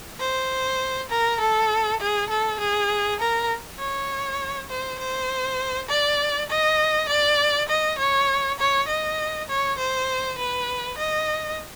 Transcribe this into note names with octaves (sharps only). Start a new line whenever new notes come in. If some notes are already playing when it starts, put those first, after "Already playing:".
C5
A#4
A4
G#4
A4
G#4
A#4
C#5
C5
C5
D5
D#5
D5
D#5
C#5
C#5
D#5
C#5
C5
B4
D#5